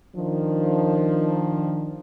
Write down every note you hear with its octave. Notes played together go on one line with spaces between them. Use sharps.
D#3 F3 D4